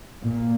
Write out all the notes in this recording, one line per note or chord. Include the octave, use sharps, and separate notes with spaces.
A#2 A#3